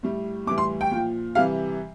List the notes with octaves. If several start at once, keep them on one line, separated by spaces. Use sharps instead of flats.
A2 G3
A2 E3 G3 D6
C6
G5
A#2 F3
C3 E3 G3 F5